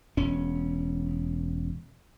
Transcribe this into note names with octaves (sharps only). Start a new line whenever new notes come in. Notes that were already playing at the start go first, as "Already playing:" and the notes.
E1 C#4